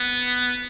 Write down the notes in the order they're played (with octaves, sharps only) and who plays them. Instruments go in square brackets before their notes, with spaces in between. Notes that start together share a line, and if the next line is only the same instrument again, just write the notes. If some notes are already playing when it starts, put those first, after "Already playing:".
Already playing: [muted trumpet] B3